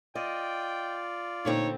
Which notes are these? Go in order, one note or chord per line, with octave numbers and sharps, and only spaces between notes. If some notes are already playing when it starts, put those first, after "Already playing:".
F4 D5 D#5 G5
A#2 D3 C4 D#4 C#5